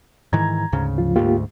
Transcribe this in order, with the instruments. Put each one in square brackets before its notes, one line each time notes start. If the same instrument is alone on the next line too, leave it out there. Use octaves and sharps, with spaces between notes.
[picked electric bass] G#2 D#3 E3 [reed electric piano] A#5 G#6
[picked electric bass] D2 G#2 C#3
[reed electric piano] F3 F4
[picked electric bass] D2 G#2 [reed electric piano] A#3 F4 G4